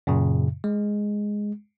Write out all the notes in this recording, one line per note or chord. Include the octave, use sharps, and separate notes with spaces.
F#2 A#2 C#3
G#3